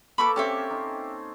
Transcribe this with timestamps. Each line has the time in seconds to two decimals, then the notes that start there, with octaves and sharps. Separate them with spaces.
0.18 A#3 A4 B4 B5 C#6 D6
0.36 C4 C#4 G4 A4 E5
0.70 D#4